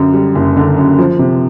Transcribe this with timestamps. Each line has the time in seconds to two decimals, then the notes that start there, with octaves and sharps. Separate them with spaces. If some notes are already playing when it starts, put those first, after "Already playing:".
Already playing: F#2 D3
0.14 G3
0.35 F#1
0.57 D3
0.77 F#2
0.99 F3
1.19 C3